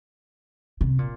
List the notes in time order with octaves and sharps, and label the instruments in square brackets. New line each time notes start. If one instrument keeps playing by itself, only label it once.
[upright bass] C3
A#2